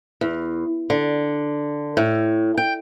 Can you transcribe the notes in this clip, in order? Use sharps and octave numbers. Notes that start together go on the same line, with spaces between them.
E2
D3
A2
G5